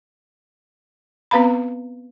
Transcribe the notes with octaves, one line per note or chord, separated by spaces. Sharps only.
B3 C4 B4 F5 A#5 B5